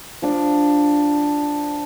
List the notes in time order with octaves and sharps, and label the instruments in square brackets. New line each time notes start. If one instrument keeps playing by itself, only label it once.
[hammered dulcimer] F3 D4